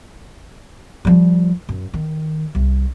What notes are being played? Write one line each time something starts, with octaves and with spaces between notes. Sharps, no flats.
F3 G3
F#2
D#3
C2